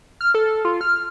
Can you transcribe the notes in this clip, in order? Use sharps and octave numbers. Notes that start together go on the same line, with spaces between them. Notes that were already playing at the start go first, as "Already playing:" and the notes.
F6
A4
F4
F6